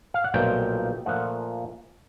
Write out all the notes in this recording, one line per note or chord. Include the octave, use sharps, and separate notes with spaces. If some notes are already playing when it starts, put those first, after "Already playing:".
F5
F#5
B1 A#2 F3 A3 G5
A#2 F3 A3 F#5